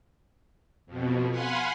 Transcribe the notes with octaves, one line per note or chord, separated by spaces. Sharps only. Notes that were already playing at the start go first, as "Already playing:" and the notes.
F2 B2
F5 F#5 G#5 B5 C6